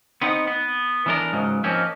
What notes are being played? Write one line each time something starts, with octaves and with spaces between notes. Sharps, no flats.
B3 C4 D#4 F#5
B3
E3 B3 D4 A4 A#4
C#2 G#2 C#3 F#3
F3 A#3 C4 C#4 D#4